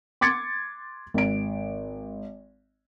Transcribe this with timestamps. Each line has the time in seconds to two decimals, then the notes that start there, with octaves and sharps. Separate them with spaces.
0.21 C6 D6 G#6 A6 C#7
1.14 G#1 D7